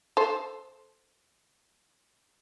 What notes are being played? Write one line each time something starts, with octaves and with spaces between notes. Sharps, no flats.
A4 C5